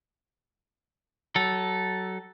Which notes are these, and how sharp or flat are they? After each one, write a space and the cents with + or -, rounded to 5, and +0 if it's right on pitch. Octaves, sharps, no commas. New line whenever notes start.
F#3 +25 A4 +0